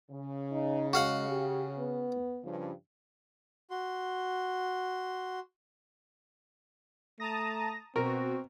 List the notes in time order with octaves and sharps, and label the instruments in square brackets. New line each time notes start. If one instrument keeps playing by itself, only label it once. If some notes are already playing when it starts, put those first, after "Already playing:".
[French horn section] C#3
[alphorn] D#4
[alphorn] G#3 [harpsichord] F#4 F5 F#5
[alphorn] G4
B3
[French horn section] G2 C#3 F3
[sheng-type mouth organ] F#4 C6
[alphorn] A3 [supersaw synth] A5 A#5 D#6 [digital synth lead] A#6
[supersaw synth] B2 [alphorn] C4 [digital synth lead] F#4 [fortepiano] A#4